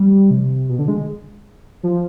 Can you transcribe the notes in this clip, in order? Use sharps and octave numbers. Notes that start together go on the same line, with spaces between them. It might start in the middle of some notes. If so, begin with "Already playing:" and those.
Already playing: G3
C3
B2
D3
G#3
F3